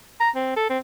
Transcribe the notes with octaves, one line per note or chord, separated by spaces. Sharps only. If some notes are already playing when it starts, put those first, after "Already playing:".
A#5
C4
A4
C4